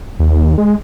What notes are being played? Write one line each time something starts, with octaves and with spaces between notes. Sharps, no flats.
D#2
G#3